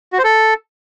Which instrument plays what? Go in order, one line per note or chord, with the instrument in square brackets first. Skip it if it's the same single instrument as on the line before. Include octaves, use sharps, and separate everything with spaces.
[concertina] F#4
C5
A4